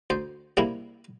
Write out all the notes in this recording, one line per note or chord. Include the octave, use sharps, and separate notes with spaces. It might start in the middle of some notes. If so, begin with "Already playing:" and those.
D2 C5
C3 G3 A#3 E4